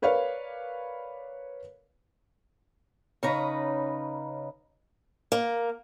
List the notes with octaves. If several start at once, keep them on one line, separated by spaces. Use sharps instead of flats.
A#4 B4 C#5 D5 F5
C#3 C#4 D#4 B4 A#5
A#3